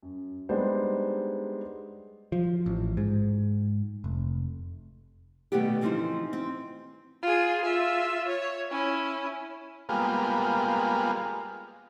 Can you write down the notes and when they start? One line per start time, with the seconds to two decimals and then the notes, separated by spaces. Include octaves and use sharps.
0.03 F#2
0.49 G3 G#3 B3 D4 D#4 C5
2.32 F3
2.66 A1
2.97 G#2
4.04 F1
5.52 B2 D#3 G3 A3 B3 G4
5.81 C#3 E3 F3 C4 D#4 C5
6.33 C4
7.23 F4 G#4
7.62 F4 E5
8.27 C#5
8.71 C#4 E4
9.89 G3 G#3 A#3 B3 F4